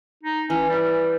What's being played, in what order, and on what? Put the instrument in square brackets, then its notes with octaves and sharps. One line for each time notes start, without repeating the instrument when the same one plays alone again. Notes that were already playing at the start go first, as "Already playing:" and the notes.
[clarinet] D#4
[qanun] E3 [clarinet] C#4
[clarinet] G3